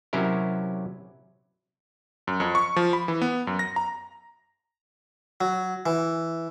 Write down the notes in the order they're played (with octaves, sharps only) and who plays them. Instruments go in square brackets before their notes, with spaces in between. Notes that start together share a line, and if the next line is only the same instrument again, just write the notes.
[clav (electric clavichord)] C3 F#3 C#4 E4 A#4
[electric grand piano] F#2
F2
C#6
F3
B5
E3
B3
F#2
A#6
A#5
[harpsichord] F#3
E3